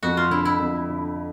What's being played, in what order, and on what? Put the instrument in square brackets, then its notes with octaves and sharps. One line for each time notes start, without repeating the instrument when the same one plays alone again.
[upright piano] F2 [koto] F#4
[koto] F4
[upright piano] D3 [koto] E4
[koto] E4
[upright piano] F2
D3